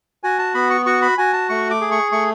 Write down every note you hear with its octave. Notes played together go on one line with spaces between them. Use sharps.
F#4 G#5
A5
B3 B5
C#6
F#4 C#6
B5
F#4 G#5
A5
A3 C#6
D6
G#4
C#6
A3 C#6